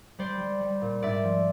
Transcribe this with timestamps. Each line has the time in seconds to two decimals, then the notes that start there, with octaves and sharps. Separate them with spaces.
0.19 G3 C5 D5
0.40 G3
0.61 G3
0.82 A#2
1.02 G#2 D5 E5
1.24 F3